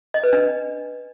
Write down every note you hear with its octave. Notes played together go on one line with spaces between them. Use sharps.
D#5
B4
D4